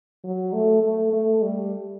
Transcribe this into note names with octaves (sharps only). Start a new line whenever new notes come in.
F#3
A3
A3
A3
G3